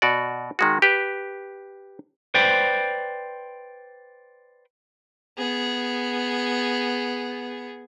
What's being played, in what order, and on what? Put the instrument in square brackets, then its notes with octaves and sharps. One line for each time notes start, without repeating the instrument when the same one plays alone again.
[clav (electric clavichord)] B2 F#4 D5
D#3 G#3 F#4
G4 B4
[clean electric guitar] B4 C5 D5 G5
[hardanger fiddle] B3 G#4